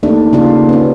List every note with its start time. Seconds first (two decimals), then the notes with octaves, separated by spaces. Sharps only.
0.03 D#2 A3 D4
0.33 C#3 D4 F4
0.69 B3 C#4